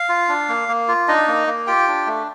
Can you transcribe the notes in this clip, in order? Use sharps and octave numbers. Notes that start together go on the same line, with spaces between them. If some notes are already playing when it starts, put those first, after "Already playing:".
Already playing: F5
F4
D4
A#3
A#3
F4
D4 D#4 D#5
A#3
A#3
F4 G4 G5
D4
A3